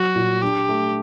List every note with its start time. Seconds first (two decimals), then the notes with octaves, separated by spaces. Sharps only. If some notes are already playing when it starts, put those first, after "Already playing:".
Already playing: F#3 F#4
0.16 A#2
0.42 D4 G4
0.69 A3